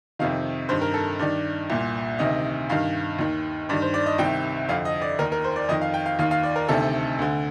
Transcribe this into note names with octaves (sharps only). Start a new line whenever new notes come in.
F2 C3 D#3 F5
G2 D#3 C5
A#4
A4
G2 D#3 D5
C2 A#2
D2 C3 D#3 D#5
G2 D#3 F5
D#2 D#3
G2 D#3 D5
C5
D5
D#5
C2 C3 D#3 G5
F2 D3 F5
D#5
D5
D#2 D#3 A#4
A#4
C5
D5
F2 D#3 D#5
F5
G5
F5
D#2 D#3 F5
F5
D5
A#4
D2 C3 D#3 A4
D2 D3